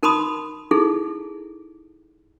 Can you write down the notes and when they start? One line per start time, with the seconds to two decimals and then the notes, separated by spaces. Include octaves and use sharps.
0.03 D#4 A#4 A5 B5 C6 D#6
0.71 D#4 E4 G#4 A4